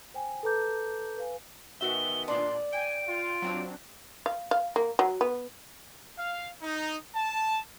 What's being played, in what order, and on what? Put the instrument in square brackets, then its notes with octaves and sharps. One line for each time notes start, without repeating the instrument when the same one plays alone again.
[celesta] C5 G5 G#5
A4 B4 A5 A#5 D6 G6
B4 F5 G#5
[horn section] D#3 B3 G#5 [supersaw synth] F#4 E5 [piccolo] G7
[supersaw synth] A#2 D4 [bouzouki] D5 [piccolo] C6
[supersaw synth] G5 [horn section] G#5 [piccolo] D7
[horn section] F4
[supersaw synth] F#3 C4 D4
[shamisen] F5
F5
A#3
F#3
B3
[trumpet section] F5
D#4
A5